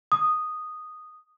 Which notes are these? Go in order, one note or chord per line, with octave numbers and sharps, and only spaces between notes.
D#6